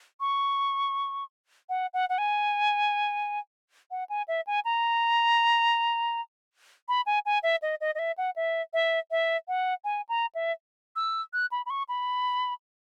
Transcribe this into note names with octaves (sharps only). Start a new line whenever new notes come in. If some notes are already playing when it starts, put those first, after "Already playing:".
C#6
F#5
F#5
F#5
G#5
F#5
G#5
E5
G#5
A#5
B5
G#5
G#5
E5
D#5
D#5
D#5
E5
F#5
E5
E5
E5
F#5
G#5
A#5
E5
E6
F#6
B5
B5
C#6
B5